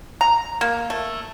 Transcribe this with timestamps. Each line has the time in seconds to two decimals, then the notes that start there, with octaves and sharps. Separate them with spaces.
0.21 A#5
0.61 A#3
0.90 A3